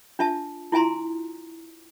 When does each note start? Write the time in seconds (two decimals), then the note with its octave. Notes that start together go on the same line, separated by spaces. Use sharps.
0.19 D4 F4 E5 A5
0.72 E4 F4 E5 G#5 A#5 C6